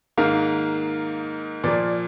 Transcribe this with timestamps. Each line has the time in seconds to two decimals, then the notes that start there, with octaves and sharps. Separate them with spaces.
0.18 G#2 D#3 A#3 F5
1.64 A#2 F3 A#3 D5